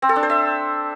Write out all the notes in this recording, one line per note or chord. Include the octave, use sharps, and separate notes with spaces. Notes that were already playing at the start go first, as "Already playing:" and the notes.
C4
A4
D4
C5
E5